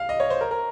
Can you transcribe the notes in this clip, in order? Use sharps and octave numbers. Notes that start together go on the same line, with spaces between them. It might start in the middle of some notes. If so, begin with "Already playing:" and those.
Already playing: F5
D#5
C#5
C5
A#4
A#4